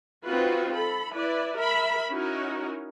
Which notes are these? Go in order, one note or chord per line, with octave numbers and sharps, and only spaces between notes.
C4 D#4 F4 F#4 B4
A4 B5
E4 B4 D5
A#4 E5 B5
C#4 D#4 E4 F#4 A#4